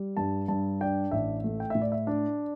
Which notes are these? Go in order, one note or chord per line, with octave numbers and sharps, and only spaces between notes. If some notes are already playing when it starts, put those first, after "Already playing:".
Already playing: G3
G2 A5
G2 A5
D4 G5
A1 E5
A3
G5
A2 E5
D5
E5
D4 D5